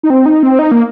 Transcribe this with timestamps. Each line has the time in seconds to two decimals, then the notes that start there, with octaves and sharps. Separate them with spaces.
0.03 D#4
0.10 C4
0.26 D#4
0.43 C4
0.59 D#4
0.72 A#3